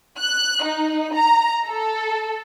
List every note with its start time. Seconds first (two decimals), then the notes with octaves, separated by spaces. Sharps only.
0.18 F#6
0.64 D#4
1.13 A#5
1.67 A4